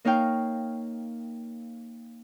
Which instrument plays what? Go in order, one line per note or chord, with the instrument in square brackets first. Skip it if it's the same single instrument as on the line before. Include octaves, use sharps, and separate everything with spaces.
[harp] A#3 D#4 C#5 F5 G5